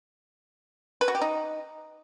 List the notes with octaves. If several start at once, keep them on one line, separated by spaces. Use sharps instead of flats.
B4
F#4
G4
D#4